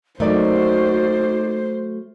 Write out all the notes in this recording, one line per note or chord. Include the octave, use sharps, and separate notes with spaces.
F#3 A3 A#3 D#4 F#4 C5 D5